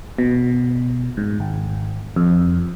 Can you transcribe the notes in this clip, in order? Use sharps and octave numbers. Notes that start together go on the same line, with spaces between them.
B2
G#2
G#1
F2